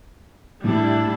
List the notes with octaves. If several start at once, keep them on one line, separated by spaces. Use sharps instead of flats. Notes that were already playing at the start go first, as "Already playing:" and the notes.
A2 G3 D4 E4